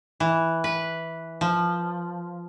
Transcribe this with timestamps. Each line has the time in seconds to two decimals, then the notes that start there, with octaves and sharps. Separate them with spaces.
0.20 E3
0.64 B4
1.41 F3